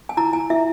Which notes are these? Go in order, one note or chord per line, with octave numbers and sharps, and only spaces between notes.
G#5
E4 A#5
G#5
E4 E5